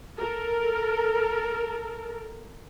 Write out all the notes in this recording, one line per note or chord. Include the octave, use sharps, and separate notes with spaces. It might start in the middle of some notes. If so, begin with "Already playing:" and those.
A4 A#4